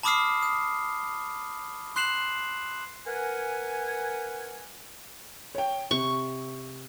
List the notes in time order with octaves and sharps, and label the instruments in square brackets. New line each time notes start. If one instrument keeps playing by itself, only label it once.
[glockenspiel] A5 B5 D6 D#6 F6 C7
D#6
C6 F#6 C7 E7 F#7
[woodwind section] A#4 B4 F#5 G#5
[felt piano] C#5 G5
[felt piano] C3 [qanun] C#6